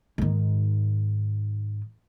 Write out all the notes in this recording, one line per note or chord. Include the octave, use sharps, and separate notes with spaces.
G#2 D#3